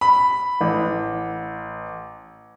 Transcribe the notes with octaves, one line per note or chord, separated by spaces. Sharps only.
B5
A1